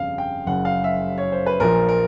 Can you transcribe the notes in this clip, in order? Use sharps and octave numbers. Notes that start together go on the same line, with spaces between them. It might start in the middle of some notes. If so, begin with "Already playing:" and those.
Already playing: G1 F2 C#3 F5
G5
F#1 F#2 C#3 F#5
F5
E5
C#5
C5
B4
A#1 A#2 F3 A#3 A#4
A#4